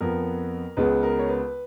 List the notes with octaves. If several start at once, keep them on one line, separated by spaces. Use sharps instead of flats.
F2 F3 B3 A#4
C#2 C#3 G#3 B3 B4
A#4
C#5
B4